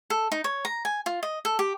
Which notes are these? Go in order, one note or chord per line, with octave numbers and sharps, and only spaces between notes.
A4
D#4
C#5
A#5
G#5
F4
D#5
A4
G4